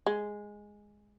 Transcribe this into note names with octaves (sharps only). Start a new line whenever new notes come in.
G#3